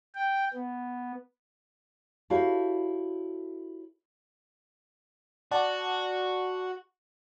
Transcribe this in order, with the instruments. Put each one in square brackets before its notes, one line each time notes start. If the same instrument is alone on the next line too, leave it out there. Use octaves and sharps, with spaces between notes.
[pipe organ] G5
B3
[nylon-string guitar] E4 F#4 G4 A4 C#5 F5
[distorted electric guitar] F#4 [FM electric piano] D5 F#5 A5